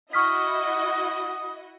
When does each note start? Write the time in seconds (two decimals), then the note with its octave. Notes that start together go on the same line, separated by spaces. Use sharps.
0.13 E4 F#4 D#5 C#6 D#6 F6 B6